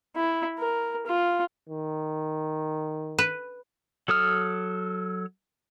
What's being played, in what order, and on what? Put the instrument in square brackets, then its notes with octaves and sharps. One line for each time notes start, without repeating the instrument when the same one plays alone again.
[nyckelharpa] E4
A#4
F4
[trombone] D#3
[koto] B4
[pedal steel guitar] F#3 A4 D#6 F6